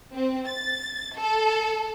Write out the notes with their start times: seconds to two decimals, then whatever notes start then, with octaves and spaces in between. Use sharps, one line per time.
0.13 C4
0.48 A6
1.19 A4